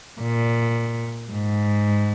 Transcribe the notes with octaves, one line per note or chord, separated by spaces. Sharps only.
A#2
G#2